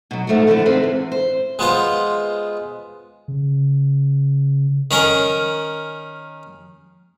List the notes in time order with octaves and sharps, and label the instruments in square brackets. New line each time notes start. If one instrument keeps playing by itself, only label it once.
[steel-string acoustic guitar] B2 F#3
G#2 F3 A3 B3 F#4
D3 E3 B3 C#4 D4
C4 F4 G#4 A4 B4 C5
E2
C5
[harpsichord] G#3 B3 F4 C5
[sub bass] C#3
[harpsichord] D#3 C#4 A#4